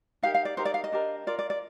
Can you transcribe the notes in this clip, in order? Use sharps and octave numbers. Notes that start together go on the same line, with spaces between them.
D#4 G4 A#4 F5
F5
D5
D#4 G4 A#4 C5
D5
F5
D#5
D4 G4 A#4
F4 A#4 D5
D5
D5